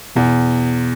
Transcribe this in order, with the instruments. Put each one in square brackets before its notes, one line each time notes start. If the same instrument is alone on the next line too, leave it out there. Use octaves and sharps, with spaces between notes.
[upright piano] E2 [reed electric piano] B2